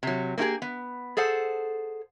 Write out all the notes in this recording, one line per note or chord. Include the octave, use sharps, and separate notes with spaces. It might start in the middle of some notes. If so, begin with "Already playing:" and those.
C3 F#3
A#3 C#4 E4 G4 G#4
B3
G#4 A4 C5 F#5